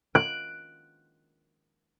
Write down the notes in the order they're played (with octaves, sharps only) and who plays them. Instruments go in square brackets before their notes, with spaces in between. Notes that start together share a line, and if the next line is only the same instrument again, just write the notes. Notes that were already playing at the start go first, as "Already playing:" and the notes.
[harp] F#6 D7